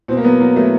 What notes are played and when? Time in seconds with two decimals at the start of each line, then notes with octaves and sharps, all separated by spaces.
0.08 B2 C4
0.17 A#3
0.24 F#3 B3
0.40 F#3 A#3
0.56 F#3 A3